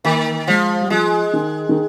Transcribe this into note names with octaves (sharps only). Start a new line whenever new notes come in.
D#3 A#3
F3 G#3
G3
F3 G#3
D#3
D#3